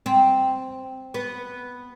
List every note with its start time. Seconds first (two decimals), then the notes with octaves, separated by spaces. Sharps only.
0.06 C4
1.14 B3